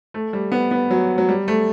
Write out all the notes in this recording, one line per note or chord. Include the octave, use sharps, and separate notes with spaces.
A3
G3
B3
B3
F#3
F#3
G3
A3